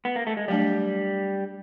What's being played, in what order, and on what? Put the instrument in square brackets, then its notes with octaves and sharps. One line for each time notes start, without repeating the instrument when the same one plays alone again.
[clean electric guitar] B3
A#3
A3
G#3
[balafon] F#3 A3 D4 [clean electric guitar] G3